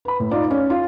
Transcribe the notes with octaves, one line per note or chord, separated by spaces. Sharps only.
B4 B5
A2
D#4 F4 D5
C#4
F4